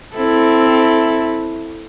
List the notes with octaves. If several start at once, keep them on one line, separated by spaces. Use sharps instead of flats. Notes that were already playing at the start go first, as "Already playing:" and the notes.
C4 E4 A4